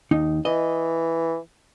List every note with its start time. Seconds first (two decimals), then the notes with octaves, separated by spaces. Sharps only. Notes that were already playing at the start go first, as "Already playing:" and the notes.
0.11 D#2 D#4
0.45 E3 D#5